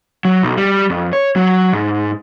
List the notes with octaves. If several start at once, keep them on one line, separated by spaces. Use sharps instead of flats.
F#3
B1
G3
F2
C#5
F#3
G#2